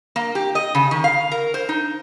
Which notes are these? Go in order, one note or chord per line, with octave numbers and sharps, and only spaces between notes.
A#3
G4
D#5
C#3
D#3
F5
A#4
C5
D#4